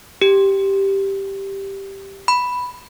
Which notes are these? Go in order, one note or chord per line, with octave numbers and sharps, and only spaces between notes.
G4
B5